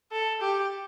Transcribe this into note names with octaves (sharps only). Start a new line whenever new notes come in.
A4
G4